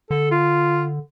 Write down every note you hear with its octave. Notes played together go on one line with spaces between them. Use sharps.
D3 A4
F4